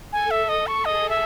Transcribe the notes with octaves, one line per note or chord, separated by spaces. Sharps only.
A4 G#5
E5
D#5
C#6
G#4 D#5
E5